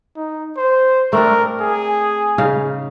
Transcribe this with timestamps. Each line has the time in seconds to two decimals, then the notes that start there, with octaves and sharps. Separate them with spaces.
0.16 D#4
0.57 C5
1.13 A3 C4 D4 A#4
1.61 G#4
2.38 C#3 D#4 F5